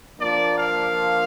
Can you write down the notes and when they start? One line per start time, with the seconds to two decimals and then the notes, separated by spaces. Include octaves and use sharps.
0.20 F3 A#3 D4 F4 D5
0.57 F5